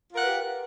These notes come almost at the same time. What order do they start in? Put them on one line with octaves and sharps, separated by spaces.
F4 A#4 F#5 B4 G4